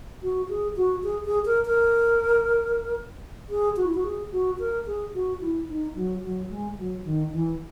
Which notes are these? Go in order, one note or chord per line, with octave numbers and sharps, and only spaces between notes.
F#4
G#4
F#4
G#4
G#4
A#4
A#4
G#4
F#4
E4
F#4
G#4
F#4
A#4
G#4
F#4
E4
D#4
F#3
F#3
G#3
F#3
D#3
E3